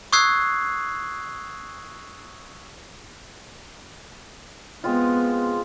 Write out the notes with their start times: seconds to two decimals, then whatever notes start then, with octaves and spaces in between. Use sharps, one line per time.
0.13 C#6 D#6 E6 F#6 G#6 C7
4.84 G#3 B3 C4 F4